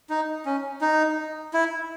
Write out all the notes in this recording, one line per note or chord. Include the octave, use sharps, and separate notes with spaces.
D#4
C#4
D#4
E4